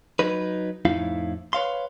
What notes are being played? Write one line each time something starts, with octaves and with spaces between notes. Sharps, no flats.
F#3 D#4 B4
F2 A2 D#4 E4 F5
B4 C#5 F5 C6